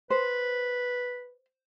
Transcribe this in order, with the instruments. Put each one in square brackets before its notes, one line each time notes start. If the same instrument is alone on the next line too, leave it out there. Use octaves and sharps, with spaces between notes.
[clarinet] B4 [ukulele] C5